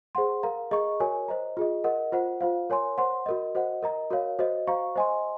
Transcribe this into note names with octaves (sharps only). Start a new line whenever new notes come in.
G#4 C5 F#5 C6
A#4 F5 A#5
G#4 D#5 A#5 C#6
F#4 A#4 C#5 G#5
C5 D#5 A#5
F4 G#4 D#5
A#4 D#5 F#5
F4 C5 F#5
F4 C5 F5
A#4 C#5 G#5 C6
C5 F#5 C6
F#4 A#4 D#5
F#4 C5 D#5 F#5
A#4 D#5 A#5
F#4 A#4 C#5 F5
F#4 C5 D#5
F#4 C5 F5 A#5 C#6
C5 D#5 G#5 C6